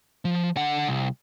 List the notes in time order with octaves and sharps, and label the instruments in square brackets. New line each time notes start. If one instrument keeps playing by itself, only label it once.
[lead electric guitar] F3
D3 F#5
C2